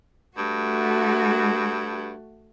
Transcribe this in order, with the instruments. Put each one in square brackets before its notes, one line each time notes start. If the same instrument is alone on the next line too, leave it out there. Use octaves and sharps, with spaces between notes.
[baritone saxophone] G2 [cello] A3 F#4